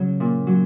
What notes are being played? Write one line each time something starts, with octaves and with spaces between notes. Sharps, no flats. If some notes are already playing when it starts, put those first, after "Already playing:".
Already playing: C#3 F#3
A#2
F#3